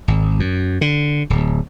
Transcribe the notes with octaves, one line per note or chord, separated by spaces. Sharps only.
G#1
F#2
D3
D1